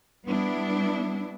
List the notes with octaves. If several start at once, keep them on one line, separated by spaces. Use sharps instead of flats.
G3 B3 D4 E4